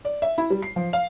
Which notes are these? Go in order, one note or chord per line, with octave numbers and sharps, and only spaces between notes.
D5
E5
E4
G3
C7
F3
F5